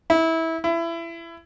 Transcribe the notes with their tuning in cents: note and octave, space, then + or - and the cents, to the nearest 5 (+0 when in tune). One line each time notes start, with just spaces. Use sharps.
E4 -20
E4 +25